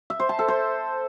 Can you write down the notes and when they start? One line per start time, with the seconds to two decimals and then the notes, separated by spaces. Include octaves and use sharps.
0.10 E5
0.20 C5
0.29 A5
0.39 A4
0.48 C5